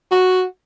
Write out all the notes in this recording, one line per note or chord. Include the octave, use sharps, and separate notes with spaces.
F#4